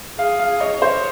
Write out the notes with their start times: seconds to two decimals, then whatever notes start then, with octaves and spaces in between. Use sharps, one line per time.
0.18 G#4 F5
0.39 F5
0.60 C#5 D#5
0.82 C5